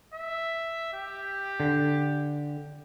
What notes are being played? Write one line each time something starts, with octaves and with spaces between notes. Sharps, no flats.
E5
G4
D3